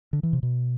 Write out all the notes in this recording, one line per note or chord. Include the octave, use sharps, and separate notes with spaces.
D3
E3
C3
B2